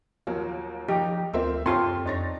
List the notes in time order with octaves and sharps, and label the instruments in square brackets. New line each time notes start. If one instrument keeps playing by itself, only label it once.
[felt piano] D#2 F#3 A#3 [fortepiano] F3
[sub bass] F3 [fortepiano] D#4 [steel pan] G4
[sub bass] D2 [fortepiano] A#3 C4 F4 [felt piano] C5 E5 E6
[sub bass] F#2 [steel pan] C4 F4 [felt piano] G4 A4 A5 [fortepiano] C#5 C6
[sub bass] F2 [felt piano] D4 A6 A#6 [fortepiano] D#4 C#5